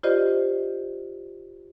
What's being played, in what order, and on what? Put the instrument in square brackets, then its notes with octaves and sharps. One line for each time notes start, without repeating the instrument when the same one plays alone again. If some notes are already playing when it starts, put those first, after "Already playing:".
[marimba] F4 G4 C5 D5 D#5